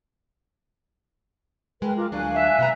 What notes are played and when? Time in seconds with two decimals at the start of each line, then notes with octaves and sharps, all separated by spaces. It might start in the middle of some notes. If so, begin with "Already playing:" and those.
1.82 G#3 A#4 B4 G5
1.97 F4 A#4 D6
2.12 D2 F#3 D4 F5 G#5 F#6
2.35 E5
2.58 B2 B3 A#5